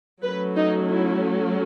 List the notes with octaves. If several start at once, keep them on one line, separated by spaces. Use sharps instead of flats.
F#3 A3 C#4 B4
D#4
E4